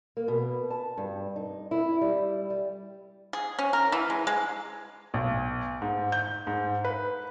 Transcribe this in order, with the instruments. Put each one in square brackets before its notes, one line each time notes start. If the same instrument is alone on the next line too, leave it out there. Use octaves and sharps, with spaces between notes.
[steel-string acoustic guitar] A#3
B2
A5
G2
D#4
E4
G3
G3
[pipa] G#4
C#4
A#4
E3
G#3
G#3
[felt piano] B1
G#2
G6
G#2
B4